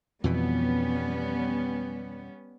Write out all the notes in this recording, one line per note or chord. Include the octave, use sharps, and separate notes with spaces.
F2 B2 E3 G3 B3 C#4